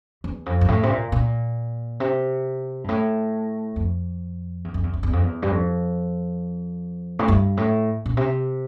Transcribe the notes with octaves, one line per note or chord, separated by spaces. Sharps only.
E2
F2
G2
A2
C3
A#2
A#2
C3
G2
A2
F2
E2
F2
E2
F2
E2
F2
E2
G2
F2
A2
G2
A2
A#2
C3